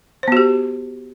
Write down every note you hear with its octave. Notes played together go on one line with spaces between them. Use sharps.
B3 F#4 G4 C5